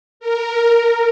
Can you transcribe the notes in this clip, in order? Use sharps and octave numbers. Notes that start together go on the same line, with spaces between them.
A#4